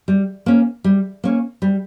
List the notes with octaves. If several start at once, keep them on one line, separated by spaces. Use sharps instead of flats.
G3
A#3 C#4
G3
A#3 C#4
G3